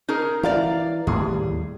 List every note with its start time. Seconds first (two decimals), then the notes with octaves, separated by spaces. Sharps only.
0.08 D#4 G#4 A#4
0.43 E3 D5 F5 A#5
1.07 D#2 A2 G3 G#4